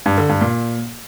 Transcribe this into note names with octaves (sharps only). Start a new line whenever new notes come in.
G2
D3
G2
A#2